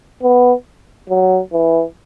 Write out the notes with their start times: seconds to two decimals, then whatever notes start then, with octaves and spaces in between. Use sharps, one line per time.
0.22 B3
1.09 F#3
1.53 E3